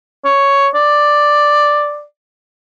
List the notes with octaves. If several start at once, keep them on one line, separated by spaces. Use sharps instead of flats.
C#5
D5